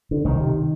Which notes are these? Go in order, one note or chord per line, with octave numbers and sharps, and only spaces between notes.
D3
C2 D#3
C3